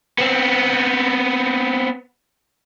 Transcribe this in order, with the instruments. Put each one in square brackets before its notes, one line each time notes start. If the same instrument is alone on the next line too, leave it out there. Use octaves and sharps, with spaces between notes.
[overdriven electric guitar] B3 C4